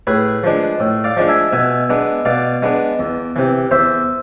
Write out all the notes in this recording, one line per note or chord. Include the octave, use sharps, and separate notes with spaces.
A2 G#4 B4
F3 G#3 D4
A2
D5 F5
F3 G#3 D4
E5 G#5
B2 E5 G#5
G#3 B3 D4
B2 D5 F5
G#3 B3 D4
E2
C3 E3
E2 C5 E5